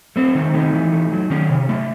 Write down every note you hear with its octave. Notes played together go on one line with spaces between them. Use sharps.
A3 C4
D#3
A3 D#4
E3
A3
F#3
D#3 C#4
C3
A3